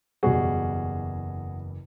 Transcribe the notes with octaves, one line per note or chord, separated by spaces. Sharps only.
F#1 E2 B2 G3 F#4 G#4